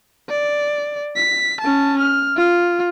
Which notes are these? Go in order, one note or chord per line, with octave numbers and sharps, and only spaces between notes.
D5
B6
C#4 A5
F6
F4